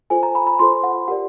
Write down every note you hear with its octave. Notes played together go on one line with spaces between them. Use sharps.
F4 A4 C5 G#5
A#5
B5
B5
F4 A4 C5 C6
F#5
G4 A#4 D5 F#5